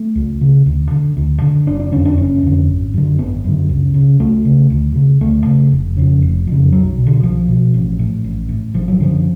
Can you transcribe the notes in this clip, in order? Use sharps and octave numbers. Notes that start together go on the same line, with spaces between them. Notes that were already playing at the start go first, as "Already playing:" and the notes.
Already playing: A3
C#2
C#3
D2
D3
D2
D3
F#1 D4
D4
F2 D3 C#4
D4
F#1 C#4
F2 D3
G#1
F#2 D3
G#1 B3
F#2 D3
C#2
C#3
C#2 A3
C#3
D2
C#3
D2 A3
C#3
F1
F2 C#3
F1
F2 C#3
B1 F#3
B2
D3
B1 F3
B2
A1
A2
A1
A2
G#1 F3
F#3
F#2 D3 F3